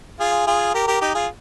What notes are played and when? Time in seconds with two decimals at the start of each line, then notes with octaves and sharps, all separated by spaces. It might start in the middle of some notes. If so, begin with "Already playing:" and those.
0.20 F4 G#4
0.47 F4 G#4
0.74 G4 A#4
0.87 G4 A#4
1.01 D#4 G4
1.15 F4 G#4